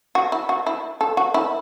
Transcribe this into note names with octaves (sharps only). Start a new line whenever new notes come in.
F#4
E4
F#4
E4
A4
F#4
E4